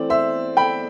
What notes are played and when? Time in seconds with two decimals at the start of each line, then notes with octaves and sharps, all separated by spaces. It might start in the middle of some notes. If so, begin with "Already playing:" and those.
Already playing: E3 A3 C4 D5
0.10 C5 E5
0.57 G5 B5